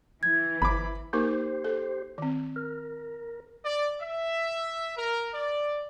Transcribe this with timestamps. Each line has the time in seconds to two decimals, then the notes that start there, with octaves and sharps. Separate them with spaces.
0.23 E3 G#6
0.62 G1 B5 D6
1.13 A#3 D#4 G4 A#4 C5
1.64 A4
2.18 D#3 C4
2.56 A#4
3.65 D5
4.01 E5
4.97 A#4
5.34 D5